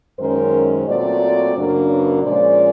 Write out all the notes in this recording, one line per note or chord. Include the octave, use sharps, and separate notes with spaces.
F#2 D#3 G#3 C#4 A#4 C5
A#2 F#3 A3 C4 C5 D5
F#2 C#3 F#3 A#3 D4
B4 C#5
A#2 F3 G#3 C#4 C5 D5